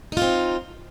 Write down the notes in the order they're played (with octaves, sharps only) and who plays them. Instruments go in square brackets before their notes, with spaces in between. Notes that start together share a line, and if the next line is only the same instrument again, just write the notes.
[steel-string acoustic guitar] D#4
F4
C4